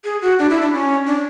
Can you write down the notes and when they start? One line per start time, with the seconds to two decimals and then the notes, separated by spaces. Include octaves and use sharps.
0.04 G#4
0.22 F#4
0.39 D4
0.50 E4
0.62 D4
0.73 C#4
1.06 D4